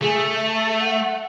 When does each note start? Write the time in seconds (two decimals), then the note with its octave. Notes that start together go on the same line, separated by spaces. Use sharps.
0.01 A3 G#4
0.36 E5
0.70 E5
0.81 F#5
0.92 E5
1.05 F#5